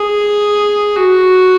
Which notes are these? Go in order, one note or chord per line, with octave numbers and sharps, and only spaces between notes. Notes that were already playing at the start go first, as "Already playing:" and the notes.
Already playing: G#4
F#4